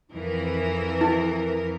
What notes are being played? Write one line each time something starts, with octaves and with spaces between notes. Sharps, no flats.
F2 E3 A#4
E4